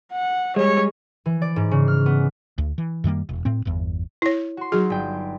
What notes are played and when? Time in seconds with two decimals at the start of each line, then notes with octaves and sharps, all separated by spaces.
0.12 F#5
0.56 G3 G#3 C#5
1.26 E3
1.42 D5
1.56 G#2
1.71 C#3
1.88 F6
2.06 B3
2.58 D2
2.78 E3
3.04 F#2 D#3 G3 A#3
3.29 E1
3.45 A2 C4
3.65 G1 E2
4.22 E4 C#5
4.57 F#4 C6
4.72 F#3 D#4 F#4 G#4
4.90 G1 G5